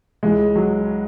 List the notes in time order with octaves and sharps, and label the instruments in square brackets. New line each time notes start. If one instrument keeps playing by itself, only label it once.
[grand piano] C#2 C#3 E3 G#3
F#3